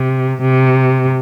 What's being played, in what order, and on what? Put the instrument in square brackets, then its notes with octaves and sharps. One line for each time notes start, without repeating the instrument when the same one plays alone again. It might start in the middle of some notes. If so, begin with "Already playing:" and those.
Already playing: [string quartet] C3
C3